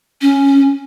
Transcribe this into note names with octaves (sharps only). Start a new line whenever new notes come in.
C#4